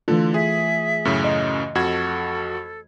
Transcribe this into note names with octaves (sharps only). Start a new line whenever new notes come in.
D3 E3 A3 F4 A4
G#4 E5
F#2 A2 C#3
D#5
F2 F#4 A4 G#6